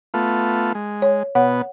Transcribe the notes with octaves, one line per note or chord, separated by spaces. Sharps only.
A3 B3 F4
G#3
C#5
B2 B3 C#5 F#5